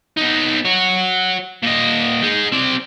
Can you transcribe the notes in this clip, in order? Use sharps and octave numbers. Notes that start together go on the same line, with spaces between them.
B3 D#4
F#4 C#5
A#2 D#5
D#4 G#4
C4 D5